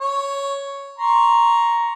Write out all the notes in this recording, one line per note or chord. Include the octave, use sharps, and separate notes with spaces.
C#5
A#5 C6 C#6